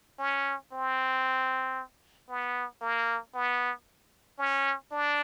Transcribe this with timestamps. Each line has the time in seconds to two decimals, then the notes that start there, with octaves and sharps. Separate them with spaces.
0.19 C#4
0.72 C4
2.29 B3
2.81 A#3
3.35 B3
4.38 C#4
4.92 D4